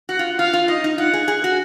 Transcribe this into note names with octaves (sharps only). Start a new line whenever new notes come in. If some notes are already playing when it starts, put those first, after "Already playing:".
F#4 F#5
F4
F4 F5
F4
D#4 D#5
D#4
F4 F#5
G#4
G#4
F#4